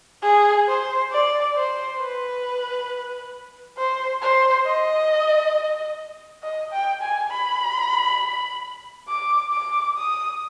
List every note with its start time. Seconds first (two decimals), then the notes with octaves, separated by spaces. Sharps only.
0.23 G#4
0.67 C5
1.12 D5
1.55 C5
2.00 B4
3.78 C5
4.22 C5
4.66 D#5
6.43 D#5
6.72 G5
7.01 G#5
7.31 B5
9.09 D6
9.53 D6
9.97 D#6